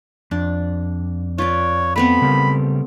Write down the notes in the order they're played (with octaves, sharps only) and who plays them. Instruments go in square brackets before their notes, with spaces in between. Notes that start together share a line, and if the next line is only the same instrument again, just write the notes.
[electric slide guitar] F2 [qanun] D4
[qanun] F4 B4 D5 [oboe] C#5
[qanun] A3 B3 C4 [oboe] B5
[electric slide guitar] C#3 G3 A#4